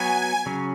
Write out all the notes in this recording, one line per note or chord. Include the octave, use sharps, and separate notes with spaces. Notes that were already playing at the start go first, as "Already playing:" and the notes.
Already playing: F#3 B3 F#4 C#5 G#5
C#3 F#3 C#4